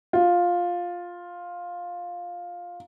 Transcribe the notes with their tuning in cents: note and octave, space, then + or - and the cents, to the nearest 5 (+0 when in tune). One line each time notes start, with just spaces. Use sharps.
F4 +10